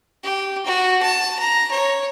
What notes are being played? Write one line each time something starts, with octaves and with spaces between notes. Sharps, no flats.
G4
F#4
A5
A#5
C#5